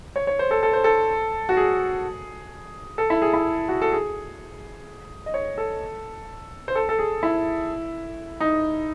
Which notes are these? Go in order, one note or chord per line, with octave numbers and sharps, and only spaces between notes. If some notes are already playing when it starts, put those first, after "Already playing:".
C#5
C#5
C5
A4
A4
C5
A4
F#4
G#4
A4
E4
G#4
E4
F#4
A4
G#4
D#5
C#5
A4
C5
A4
A4
G#4
E4
D#4